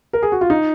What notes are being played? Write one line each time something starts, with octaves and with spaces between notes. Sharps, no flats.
A#4
G#4
F#4
F4
D#4